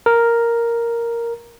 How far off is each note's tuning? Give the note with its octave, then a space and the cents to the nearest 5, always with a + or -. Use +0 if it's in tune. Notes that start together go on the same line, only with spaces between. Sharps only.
A#4 +0